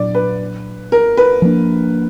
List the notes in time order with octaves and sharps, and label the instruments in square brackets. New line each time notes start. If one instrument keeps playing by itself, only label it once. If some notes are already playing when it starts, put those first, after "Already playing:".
Already playing: [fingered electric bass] A#2 F#3 D4 [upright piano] D5
[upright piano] B4
A#4
B4
[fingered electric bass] F3 A#3 D4